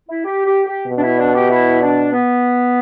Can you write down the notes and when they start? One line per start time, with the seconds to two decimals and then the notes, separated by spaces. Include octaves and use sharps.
0.08 E4
0.25 G4
0.45 G4
0.66 G4
0.87 B2
0.97 D4
1.02 E4
1.18 D4
1.34 G4
1.50 E4
1.81 D4
2.12 B3